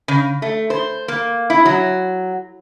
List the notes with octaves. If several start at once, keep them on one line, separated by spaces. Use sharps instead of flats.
C#3
A3
C5
A#3
E4
F#3